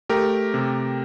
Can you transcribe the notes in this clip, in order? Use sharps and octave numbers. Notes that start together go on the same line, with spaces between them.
A3 G4 A#4
C3